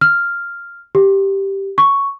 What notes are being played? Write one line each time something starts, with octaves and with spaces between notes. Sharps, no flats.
F6
G4
C#6